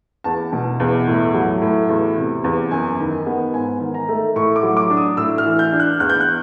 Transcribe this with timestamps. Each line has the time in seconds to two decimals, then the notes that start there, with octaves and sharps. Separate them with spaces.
0.24 E2 A5
0.53 B2
0.80 E2
1.07 A2
1.34 F#3
1.62 A2
1.89 E2
2.17 C3
2.44 E2
2.71 F#2 G#5
2.99 D#3
3.26 B3
3.53 G#2 G#5
3.80 D#3
3.94 A#5
4.08 A3
4.36 A2 C#6
4.56 D6
4.63 F#3
4.77 D6
4.90 D4
4.97 D#6
5.17 A2 E6
5.38 F6
5.45 E3
5.59 G6
5.73 D4
5.80 F#6
6.00 E2 F#6
6.10 G6
6.21 F#6